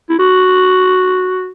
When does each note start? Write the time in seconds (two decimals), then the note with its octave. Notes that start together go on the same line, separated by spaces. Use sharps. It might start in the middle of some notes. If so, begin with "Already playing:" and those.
0.09 E4
0.19 F#4